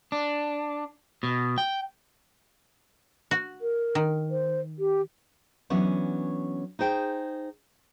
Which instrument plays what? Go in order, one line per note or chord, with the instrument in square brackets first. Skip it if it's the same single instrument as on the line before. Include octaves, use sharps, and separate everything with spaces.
[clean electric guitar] D4
B2
G5
[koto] F#4
[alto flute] A#4
[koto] D#3
[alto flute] C5
G4
[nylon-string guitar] E3 F#3 B3 C#4 D4
D#4 G#4 C5 G5